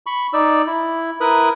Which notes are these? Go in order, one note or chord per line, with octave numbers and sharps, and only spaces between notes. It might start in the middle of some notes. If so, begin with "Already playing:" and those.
B5 C#6
D#4 D5 E6
E4
E4 A#4 B4 B5 D#6